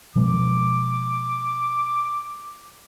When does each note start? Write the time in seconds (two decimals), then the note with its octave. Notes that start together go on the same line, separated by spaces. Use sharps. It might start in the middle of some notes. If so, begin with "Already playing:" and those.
0.16 B2 F3 G#3 D6